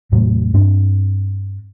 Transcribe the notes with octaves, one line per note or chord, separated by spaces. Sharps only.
E2 A2 C3 F#3
G2 C4 D4